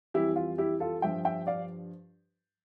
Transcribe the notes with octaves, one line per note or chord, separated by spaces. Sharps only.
F2 E3 G3 E4 G4
F4
E4 G4
F4 A4
G2 F3 E5 G5
E5 G5
D5 F5